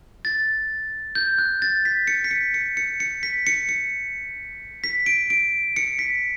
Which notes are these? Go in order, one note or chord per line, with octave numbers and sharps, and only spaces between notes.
A6
G6
F#6
A6
B6
C#7
B6
C#7
C#7
C#7
C#7
B6
C#7
C#7
B6
D7
D7
C#7
B6